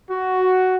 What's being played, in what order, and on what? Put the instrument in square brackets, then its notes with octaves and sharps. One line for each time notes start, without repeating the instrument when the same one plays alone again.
[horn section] F#4